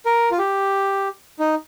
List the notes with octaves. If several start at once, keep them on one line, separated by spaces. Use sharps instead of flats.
A#4
F4
G4
D#4